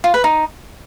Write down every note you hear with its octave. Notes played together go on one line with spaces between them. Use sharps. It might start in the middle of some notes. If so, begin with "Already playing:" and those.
F4
B4
D#4